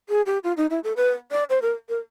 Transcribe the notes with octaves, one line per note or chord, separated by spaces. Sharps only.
G#4
G4
F4
D#4
E4
A4
B4
D5
C5
A#4
A#4